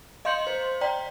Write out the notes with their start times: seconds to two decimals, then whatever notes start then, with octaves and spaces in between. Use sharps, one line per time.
0.25 D#5 F5 C6 G6 C#7 F#7
0.47 C5
0.81 D5 G5 A#5 B6